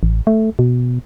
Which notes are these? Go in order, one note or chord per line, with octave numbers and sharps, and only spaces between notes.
A1
A3
B2